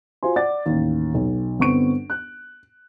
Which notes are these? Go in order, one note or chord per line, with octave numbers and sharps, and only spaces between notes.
F4 F#4 C5 G#5 C6
D5 F#5 D6 A6
A1 D#2
B1
G1 B3 C4 C#6 D7
F#6